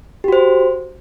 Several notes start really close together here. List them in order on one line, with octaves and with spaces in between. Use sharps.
G4 F#4 C5